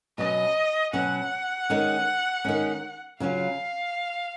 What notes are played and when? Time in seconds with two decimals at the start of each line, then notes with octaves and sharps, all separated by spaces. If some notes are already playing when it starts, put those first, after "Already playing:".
0.18 B2 F#3 C#4 D#5
0.93 B2 F#3 C#4 F#5
1.70 D#3 G#3 C#4
2.45 D#3 G#3 C#4
3.20 C#3 F#3 C#4 F4 F5